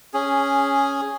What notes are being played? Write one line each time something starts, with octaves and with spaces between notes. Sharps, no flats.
C#4 G#4